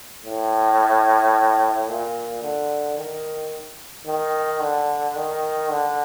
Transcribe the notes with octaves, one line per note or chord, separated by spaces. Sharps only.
A2
A#2
D3
D#3
D#3
D3
D#3
D3